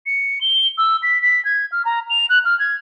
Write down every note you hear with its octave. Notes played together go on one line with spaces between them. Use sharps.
C#7
G7
E6
B6
B6
G#6
F6
A#5
F7
F#6
F6
G#6